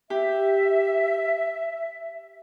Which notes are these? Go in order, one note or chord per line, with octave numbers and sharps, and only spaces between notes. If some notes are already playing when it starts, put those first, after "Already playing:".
G4 E5